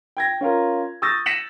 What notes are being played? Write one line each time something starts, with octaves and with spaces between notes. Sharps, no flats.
G5 G#6 A#6
C#4 F4 A#4
C#6 D#6 E6 G6 A6 A#6
A#6 B6 C#7 D#7 E7 F#7